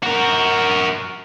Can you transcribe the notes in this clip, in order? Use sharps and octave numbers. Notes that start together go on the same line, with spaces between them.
F#4 A#4